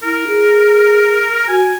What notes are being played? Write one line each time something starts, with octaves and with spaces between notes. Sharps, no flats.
E4 A#4
G#4
F#4 G#5